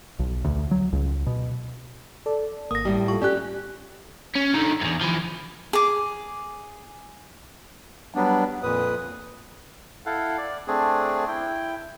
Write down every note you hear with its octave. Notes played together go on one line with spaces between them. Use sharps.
B1
D2
F#3
C#2
B2
A4 D5
G#1 A#3 D#6 A#6
A2 G3
F4 A4 C#6
C#4 G4 D5 F#6
C#4
D3 D#3
E2 G2
E3 F3
G#4 D6
F#3 G3 B3 D4
F2 A#2 B4 D#6
E4 A4 F5 F#5
D5
A3 C4 D4 G#4
E4 G5